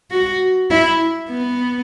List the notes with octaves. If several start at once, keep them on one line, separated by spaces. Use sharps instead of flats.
F#4
E4
B3